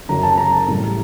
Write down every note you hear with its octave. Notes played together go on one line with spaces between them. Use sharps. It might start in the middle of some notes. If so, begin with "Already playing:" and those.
F#1 F#2 F#3 A#5
A5
A#5
A1 A2 G3